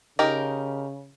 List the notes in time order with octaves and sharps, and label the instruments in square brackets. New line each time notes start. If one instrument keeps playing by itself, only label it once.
[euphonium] C#3 [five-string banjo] D#4 G4 A#4